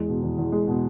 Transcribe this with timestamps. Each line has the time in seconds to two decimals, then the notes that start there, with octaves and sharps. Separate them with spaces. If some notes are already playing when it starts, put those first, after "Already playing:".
Already playing: E2 G#3
0.09 B2
0.23 E2
0.38 E2
0.52 G#3
0.68 B2